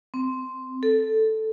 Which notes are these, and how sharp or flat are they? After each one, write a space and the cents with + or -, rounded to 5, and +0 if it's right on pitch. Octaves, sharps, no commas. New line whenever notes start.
C4 -5
A4 +0